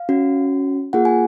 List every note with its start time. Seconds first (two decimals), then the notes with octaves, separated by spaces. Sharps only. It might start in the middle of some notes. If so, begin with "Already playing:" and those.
Already playing: F5
0.09 C#4 F#4
0.93 A#3 F4 G#4 F#5
1.05 G#5